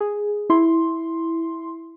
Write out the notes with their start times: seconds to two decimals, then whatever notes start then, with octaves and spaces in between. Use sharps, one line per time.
0.01 G#4
0.50 E4 C6